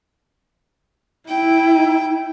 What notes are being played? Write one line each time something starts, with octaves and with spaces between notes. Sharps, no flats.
E4 G5